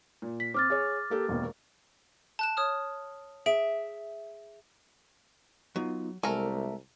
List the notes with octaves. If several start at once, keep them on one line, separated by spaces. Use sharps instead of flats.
A#2
B6
C4 D6 F6 A6
G#4 C#5
A#3 G4 A4
E1 D#2 B2
A5 F#6 E7
C#5 D#6 F6
G#4 E5 D7
F#3 B3 D#4 F4
C2 G#3 A3 A#4 G#5 A#5